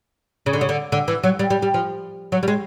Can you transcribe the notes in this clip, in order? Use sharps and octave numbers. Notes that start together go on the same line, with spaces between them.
C#3
D3
C#3
D3
D3
E3
F#3
G3
G3
G3
F3
F#3
G3
G#3